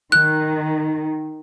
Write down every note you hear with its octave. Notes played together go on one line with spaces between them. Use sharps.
D#3 F#6